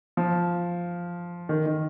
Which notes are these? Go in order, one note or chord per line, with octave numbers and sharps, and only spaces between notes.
F3
D#3
D#3